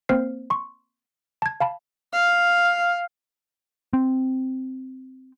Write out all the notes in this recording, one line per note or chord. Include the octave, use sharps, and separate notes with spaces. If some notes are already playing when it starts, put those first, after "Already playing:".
A#3 C4 C5 F6 C7
C6 C#6
A5 G#6
F5 A5 B5
F5
C4